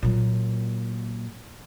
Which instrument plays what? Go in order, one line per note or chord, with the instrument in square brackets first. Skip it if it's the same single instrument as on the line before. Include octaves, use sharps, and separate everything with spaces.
[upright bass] A#2 F#3